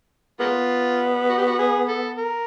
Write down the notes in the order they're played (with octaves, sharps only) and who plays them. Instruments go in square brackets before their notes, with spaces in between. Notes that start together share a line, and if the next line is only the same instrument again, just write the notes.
[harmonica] G#3 A#3 F4 [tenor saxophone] B3
[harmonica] F#4
G4
F#4
G#4
A4
A#4